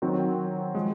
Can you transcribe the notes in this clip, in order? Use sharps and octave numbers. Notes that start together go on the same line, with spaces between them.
D#3 F#3 C4 F#4
F3 G#3